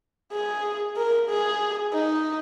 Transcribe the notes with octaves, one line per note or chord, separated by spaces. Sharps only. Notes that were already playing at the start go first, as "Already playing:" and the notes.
G#4
A#4
G#4
D#4